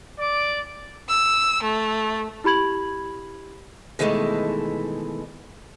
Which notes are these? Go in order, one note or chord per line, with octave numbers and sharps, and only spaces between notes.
D5 D6
E6
A3
E4 G4 B5 G#6 F#7
B2 D#3 E3 G#3 A3